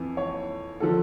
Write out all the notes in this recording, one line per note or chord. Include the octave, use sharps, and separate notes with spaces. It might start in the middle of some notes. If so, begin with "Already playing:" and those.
Already playing: F2 E3
C#5
D3 F3 A4